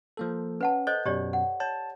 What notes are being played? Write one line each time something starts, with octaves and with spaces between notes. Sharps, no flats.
F3 A#3 A4
C#4 B4 F#5 A5
A4 C5 D#5 G6
F#2 B2 G4 C#5 D5
F#5
C#5 A5